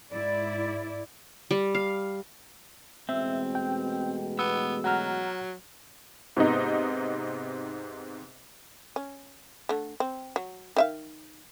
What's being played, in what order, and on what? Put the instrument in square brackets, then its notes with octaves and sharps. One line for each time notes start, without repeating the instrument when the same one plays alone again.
[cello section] G#2 E4 D5
[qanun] G3
F5
[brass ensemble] A1 B2 G#3 [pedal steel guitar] C4 [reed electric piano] E5
[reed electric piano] G5
[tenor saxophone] B3 [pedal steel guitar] E6
[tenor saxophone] F#3 [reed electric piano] F#5 A#5 F6
[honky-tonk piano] G#2 C3 B3 D#4
[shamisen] C#4
D3 A3
C4
F#3
D#3 E5 F5